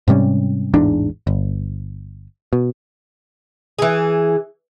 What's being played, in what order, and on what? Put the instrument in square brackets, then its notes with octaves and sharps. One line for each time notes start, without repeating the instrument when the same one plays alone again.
[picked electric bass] G#2 C3 G3 C#4
A1 E2 G#2 D4
G1
B2
[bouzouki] E3 G#4